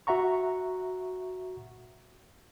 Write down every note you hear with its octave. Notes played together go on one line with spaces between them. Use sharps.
F#4 E5 F#5 A#5 C#6